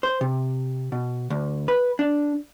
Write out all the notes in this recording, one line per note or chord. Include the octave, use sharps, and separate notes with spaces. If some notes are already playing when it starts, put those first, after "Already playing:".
C5
C3
B2
D2
B4
D4